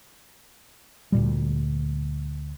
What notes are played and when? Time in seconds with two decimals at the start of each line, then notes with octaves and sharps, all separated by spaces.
1.12 D2 A#2 G3